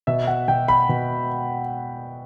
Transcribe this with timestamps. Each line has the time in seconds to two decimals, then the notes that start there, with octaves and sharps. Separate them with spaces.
0.07 B2 E5
0.27 F#5
0.48 B2 G5
0.68 B5
0.89 B2